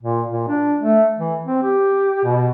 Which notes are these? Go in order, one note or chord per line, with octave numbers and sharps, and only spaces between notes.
A#2
A#2
D4
A3
E3
C4
G4
B2